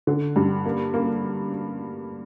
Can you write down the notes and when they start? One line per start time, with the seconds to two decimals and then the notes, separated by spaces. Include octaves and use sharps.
0.07 D3
0.36 G2
0.65 A#3
0.94 A#3